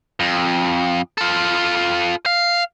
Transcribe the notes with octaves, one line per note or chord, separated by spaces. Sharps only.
F2
F4 A4
F5